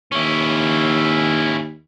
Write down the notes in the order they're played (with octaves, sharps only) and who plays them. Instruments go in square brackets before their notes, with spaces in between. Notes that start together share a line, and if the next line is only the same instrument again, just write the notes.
[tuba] D#2 [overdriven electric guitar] C#4 E4